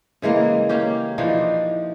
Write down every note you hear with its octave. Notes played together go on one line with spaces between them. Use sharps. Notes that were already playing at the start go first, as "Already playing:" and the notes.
C#3 E3 G#3 A#3
A#3 C#4 G4
E3 F3 D4 D#4